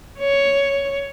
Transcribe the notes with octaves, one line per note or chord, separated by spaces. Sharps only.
C#5